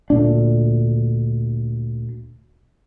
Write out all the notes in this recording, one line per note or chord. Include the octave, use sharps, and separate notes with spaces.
D2 A#2 D4